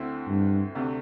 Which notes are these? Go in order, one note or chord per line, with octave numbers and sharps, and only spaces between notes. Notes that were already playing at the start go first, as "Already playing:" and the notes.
Already playing: D2 D3 C4 E4
G2
D2 C3 A3 D4